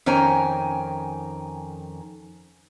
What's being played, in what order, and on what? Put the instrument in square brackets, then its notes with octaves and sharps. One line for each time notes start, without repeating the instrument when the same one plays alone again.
[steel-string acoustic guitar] F2 D#3 C#4 G5 G#5 A#5